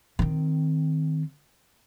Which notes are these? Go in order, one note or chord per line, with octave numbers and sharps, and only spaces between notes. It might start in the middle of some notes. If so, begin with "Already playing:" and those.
D#3 C4